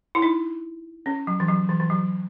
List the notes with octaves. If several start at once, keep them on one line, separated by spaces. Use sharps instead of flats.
E4
D#4
C#4
F#3
E3
F#3
E3
E3
F#3